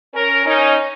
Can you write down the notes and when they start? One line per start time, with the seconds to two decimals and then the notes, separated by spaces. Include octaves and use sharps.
0.14 C#4 A#4
0.45 C#4 D#4